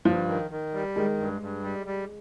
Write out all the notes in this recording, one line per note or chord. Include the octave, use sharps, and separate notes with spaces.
G2 F3
D#3
D#3
G3
D#3 G#3
G2
G2
G3
G3